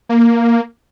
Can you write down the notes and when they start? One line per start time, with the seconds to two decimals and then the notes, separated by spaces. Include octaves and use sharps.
0.09 A#3